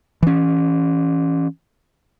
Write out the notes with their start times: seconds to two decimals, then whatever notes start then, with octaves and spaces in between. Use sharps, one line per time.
0.23 E3 C#4